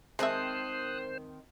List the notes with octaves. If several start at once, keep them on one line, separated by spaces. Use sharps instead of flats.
D#3 G#3 C4 C5 E5 A5 D#6 F#6